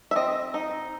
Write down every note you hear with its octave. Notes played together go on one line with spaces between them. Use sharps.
E5
C4 D#5
D#4